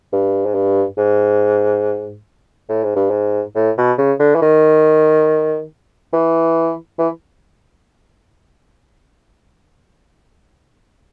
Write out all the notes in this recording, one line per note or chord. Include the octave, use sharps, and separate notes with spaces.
G2
G#2
G2
G#2
A2
G#2
G2
G#2
A2
B2
C#3
D3
E3
D#3
E3
E3